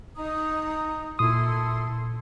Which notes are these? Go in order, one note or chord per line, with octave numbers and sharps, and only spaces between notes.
D#4 A#5 D#6
A#2 E4 A4 C6 D#6